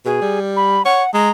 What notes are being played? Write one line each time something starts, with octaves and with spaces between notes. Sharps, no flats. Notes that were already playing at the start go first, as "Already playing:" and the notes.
B2 G#4
G3
B5
C#5 F#5
G#3 A#5